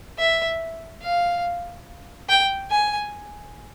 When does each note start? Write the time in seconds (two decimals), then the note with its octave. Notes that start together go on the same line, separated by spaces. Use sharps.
0.18 E5
1.03 F5
2.29 G5
2.71 G#5